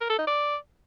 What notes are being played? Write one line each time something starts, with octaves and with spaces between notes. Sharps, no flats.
A#4
A4
D#4
D5